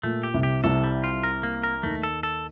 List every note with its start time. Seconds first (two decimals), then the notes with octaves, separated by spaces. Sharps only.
0.03 A#2 A3
0.23 G4
0.34 C2 C3
0.43 G4
0.64 C2 C3 A4
0.84 G3
1.04 F4
1.23 A#4
1.43 A#3
1.63 A#4
1.83 D#2 D#3 A3
2.03 A4
2.23 A4